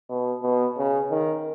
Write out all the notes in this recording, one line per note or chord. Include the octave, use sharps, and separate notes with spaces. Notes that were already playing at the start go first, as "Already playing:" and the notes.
B2
B2
C#3
D#3